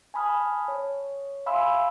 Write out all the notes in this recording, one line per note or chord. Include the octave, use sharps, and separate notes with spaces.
G#5 A5 B5 D#6 F6
C#5
E5 F5 G#5 B5 C6 E6